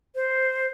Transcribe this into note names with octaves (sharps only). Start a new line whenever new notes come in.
C5